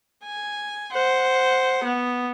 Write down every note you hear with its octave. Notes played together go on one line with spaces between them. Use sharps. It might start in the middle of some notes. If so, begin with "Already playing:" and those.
G#5
C5 F#5
B3